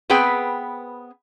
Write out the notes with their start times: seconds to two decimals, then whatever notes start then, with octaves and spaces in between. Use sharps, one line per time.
0.10 B3 C4 G#4 B4 G5